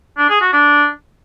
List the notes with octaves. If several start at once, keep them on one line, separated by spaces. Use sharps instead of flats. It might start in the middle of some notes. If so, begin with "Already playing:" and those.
D4
G#4
F#4
D4